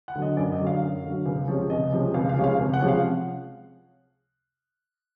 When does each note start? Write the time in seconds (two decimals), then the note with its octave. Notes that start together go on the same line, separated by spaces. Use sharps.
0.08 F#5
0.15 D3 F#3
0.22 D#5
0.37 F#2 D5
0.52 D#5
0.59 D3 F#3
0.67 F5
0.81 F#2
1.04 D3 F#3
1.26 C#2
1.48 C3 F3 G#3 C#4
1.70 C#2 D#5
1.92 C3 F3 G#3 C#4
2.14 C#2 F5
2.29 F5
2.37 C3 F3 G#3 C#4
2.44 F5
2.59 C#2
2.74 F#5
2.81 C3 F3 G#3 C#4
2.88 F5